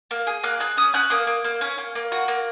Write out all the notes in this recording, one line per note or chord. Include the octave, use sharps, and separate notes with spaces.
A#3
G#4
A#3 F#6
G#4 F#6
C#4 D#6
C#4 F#6
A#3 D#6
A#3
A#3
C#4
A#3
A#3
F#4
A#3